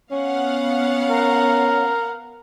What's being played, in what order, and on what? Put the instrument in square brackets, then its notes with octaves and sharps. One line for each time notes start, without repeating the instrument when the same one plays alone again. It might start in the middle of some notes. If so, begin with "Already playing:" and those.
[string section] B3 F5 F#5 [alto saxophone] C#4
[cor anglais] A#4